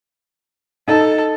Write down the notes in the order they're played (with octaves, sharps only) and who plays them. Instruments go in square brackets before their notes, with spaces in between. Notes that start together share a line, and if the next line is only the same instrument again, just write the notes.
[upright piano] D#4 [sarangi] A4